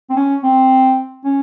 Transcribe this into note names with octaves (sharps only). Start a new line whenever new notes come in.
C4
C#4
C4
C#4